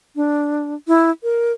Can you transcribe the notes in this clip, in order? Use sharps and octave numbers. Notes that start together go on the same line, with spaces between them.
D4
E4
A#4